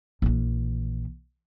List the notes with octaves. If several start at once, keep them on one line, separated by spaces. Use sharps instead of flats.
A#1 E3